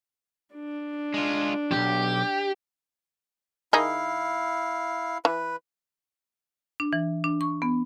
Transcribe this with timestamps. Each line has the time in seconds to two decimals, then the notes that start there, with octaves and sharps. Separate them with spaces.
0.54 D4
1.14 G#3 F4
1.72 B1 F2 G4
3.73 D#3 D#4 E4 G#4 F5
5.25 E3 B4
6.80 D4
6.93 E3
7.24 D4
7.41 C#6
7.62 B3